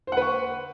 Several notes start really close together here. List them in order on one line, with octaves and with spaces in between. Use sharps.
C5 F#5 B4 C#6